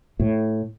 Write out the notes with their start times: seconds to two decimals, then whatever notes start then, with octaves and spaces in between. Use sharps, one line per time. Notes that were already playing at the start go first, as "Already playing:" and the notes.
0.20 A2